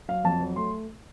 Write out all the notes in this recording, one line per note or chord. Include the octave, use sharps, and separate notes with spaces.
F#3 F5
F2 A5
F#3
A3 C6